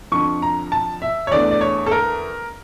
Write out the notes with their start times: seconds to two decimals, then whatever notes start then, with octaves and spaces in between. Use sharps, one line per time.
0.12 F2 D3 F3 C#6
0.42 A#5
0.72 A5
1.02 E5
1.27 C#5
1.31 E2 D3 A3 D5
1.51 D5
1.61 C#5
1.87 A4
1.91 A#4